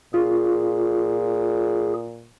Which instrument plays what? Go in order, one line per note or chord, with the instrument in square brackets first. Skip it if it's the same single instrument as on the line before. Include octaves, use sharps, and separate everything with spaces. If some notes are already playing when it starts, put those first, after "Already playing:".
[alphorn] A#2 [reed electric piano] F4 [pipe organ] G#4